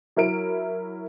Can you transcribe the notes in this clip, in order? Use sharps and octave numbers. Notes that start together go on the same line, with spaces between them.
F#3 E4 A#4 D7